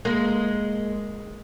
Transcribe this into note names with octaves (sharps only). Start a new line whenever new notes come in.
G#3 A#3